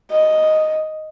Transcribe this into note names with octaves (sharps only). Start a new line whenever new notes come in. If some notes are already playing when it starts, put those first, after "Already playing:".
D#5